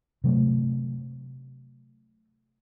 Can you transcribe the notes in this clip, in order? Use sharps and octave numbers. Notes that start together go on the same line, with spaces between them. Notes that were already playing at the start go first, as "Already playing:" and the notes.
C3 F#3 A3